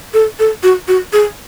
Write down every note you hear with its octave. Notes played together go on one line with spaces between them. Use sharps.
A4
A4
F#4
F#4
G#4